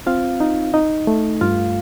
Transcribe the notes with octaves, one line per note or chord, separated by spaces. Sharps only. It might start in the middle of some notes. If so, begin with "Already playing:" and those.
C4 F4 F5
D#4
D#4 D#5
A3
G2 F4 F5